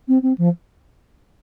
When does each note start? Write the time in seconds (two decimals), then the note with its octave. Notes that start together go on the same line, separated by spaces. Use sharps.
0.08 C4
0.22 C4
0.38 F3